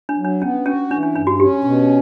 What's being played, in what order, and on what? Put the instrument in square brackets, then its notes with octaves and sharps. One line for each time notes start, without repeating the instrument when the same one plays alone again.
[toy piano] D4
[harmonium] F#3
[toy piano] D4
[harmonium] B3 [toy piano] C#4
[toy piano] C#4 [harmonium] F#4
[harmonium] E3 [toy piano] D4
[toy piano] D4
[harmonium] G2 [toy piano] D4
[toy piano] F#4
[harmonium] C#4 [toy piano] G4
[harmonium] B2